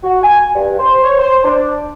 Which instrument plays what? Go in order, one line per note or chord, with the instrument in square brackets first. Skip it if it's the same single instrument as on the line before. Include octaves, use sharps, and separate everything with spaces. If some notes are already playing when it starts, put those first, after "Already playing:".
[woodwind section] F#4
G#5
G2
C5
C#5
C5
D4